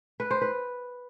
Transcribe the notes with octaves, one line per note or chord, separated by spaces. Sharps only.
B4
C5
B4